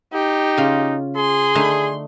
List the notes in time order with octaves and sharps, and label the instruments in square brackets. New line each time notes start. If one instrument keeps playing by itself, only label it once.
[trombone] D#4 [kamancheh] G4
[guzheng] C#3 F4
[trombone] G#4 [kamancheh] C6
[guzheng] D3 A3 D#4